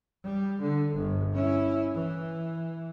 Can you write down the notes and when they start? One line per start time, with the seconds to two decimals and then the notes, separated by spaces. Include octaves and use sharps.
0.24 G3
0.61 D3
0.95 G1
1.34 C#4 E4
1.94 E3